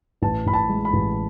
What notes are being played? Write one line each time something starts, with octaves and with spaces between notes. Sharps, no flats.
A1 A5
A1 B5
A5
G#3
B5
A1